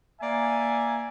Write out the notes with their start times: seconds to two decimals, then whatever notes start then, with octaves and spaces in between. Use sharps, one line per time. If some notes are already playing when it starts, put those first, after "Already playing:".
0.20 A#3 D5 E5 G#5